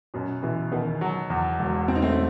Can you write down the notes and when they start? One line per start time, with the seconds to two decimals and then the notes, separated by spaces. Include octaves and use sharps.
0.14 F#2 B2
0.43 B2 E3
0.72 B2 D#3 B3
1.01 F#3
1.30 E2
1.59 E1
1.88 E2 C4
1.95 D#4
2.02 A3 C4